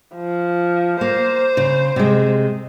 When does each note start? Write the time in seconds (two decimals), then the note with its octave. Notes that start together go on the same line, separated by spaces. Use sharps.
0.15 F3
1.01 A#3 C5
1.57 C#3
1.96 C3 G#3